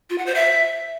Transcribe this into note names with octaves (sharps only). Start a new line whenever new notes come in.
F4
F#5
C5
E5